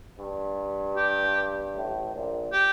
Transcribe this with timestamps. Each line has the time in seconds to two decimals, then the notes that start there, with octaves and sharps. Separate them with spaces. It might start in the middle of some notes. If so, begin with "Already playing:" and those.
0.18 G2
0.97 G4
1.74 A1 A2
2.13 A#1 A#2
2.52 G4